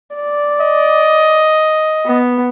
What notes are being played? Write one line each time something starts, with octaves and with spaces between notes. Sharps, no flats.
D5
D#5
B3